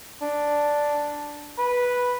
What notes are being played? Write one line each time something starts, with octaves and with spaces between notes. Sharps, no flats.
D4
B4